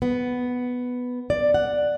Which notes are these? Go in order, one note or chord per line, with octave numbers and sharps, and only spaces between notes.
B3
D5
F#5